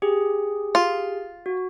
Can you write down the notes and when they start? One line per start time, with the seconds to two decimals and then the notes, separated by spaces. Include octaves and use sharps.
0.02 G4 G#4
0.75 F4
1.46 F#4